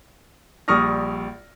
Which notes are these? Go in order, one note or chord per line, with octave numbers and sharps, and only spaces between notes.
A#1 G3 C#6 D#6 F6 A#6